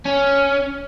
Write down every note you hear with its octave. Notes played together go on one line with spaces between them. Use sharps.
C#4